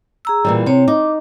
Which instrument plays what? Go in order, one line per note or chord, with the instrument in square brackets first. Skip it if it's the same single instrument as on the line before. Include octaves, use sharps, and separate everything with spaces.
[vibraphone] G#4 A#5 E6
[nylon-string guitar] A#2 E3 G3
[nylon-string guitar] C3 [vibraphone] C4 C#5
[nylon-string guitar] D#4 [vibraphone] D6